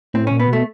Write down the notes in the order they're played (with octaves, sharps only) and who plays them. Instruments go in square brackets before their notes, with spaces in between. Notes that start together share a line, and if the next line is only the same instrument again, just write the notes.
[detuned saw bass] A2 [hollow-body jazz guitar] C4
[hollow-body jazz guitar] C#4
[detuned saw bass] A#2
[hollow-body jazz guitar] B3
[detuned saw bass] B2 [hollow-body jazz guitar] A3